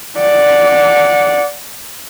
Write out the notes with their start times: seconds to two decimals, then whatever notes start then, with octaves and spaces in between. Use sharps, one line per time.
0.19 D5 F#5